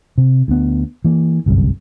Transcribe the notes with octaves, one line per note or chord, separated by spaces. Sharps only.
C3
D2 B3
E3 A#3
G1 C2 F#2